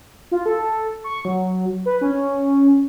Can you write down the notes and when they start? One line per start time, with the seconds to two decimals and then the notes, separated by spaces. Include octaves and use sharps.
0.31 F4
0.46 A4
1.04 C#6
1.25 F#3
1.86 B4
2.01 C#4